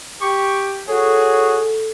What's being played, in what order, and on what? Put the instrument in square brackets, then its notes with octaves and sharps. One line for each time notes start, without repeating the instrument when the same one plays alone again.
[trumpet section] G4 [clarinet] C#6
[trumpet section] F#4 G#4 [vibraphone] A4 [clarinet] C#5